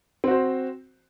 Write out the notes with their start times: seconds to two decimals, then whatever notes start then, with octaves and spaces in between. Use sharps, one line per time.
0.24 C4
0.27 F#4
0.31 C5